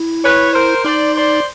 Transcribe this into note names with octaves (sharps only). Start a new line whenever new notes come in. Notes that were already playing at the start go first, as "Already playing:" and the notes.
Already playing: E4
B4 C#5
A#4 C5
D#4 C5 D5
C5 D5